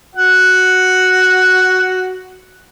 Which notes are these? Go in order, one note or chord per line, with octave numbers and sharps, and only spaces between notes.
F#4 F#5